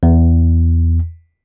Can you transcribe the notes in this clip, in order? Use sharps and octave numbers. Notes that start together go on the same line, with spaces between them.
E2